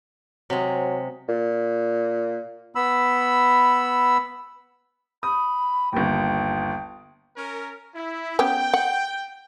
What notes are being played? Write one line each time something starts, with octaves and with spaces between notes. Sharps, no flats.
C3 F#3 G#3
A#2
B3 B5 E6
B5 D#6
G1 D#2 G5
C#4 A#4
E4
B3 C#4 G4 G5
F#5